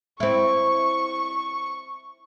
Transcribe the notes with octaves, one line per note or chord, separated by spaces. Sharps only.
C4 E4 C#6